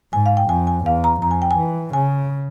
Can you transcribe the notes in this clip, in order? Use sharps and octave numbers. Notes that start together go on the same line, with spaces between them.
G#2 G#5
F5
G5
F2 G#5
G#5
E2 F5
A#5
F2 A#5
G#5
G5
G#5
E3
C#3 G#5